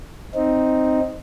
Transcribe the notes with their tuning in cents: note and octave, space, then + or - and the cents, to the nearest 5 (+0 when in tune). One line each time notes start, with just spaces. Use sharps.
C4 +0 D#4 +0